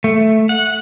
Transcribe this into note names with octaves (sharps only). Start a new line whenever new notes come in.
A3
F#5